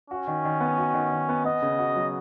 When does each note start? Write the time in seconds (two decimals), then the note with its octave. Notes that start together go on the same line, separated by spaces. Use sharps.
0.10 C#4 F#4
0.27 D#3
0.45 D#3
0.60 B3
0.78 F#4
0.94 D#3
1.11 D#3
1.29 B3
1.45 B3 D#5
1.62 C#3
1.79 F#4
1.96 F#3